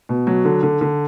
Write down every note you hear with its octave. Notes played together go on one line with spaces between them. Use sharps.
B2
F#3
D3
D3
D3